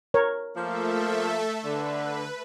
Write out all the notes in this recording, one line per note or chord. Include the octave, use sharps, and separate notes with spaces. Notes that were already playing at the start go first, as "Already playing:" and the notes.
A#4 C#5
F3 A3 A#3 A4 E5
D3 B4